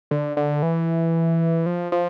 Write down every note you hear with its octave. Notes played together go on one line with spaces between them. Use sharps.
D3
D3
E3
F3
F3